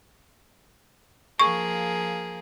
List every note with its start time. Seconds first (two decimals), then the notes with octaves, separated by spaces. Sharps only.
1.40 F3 A#3 G#4 C#6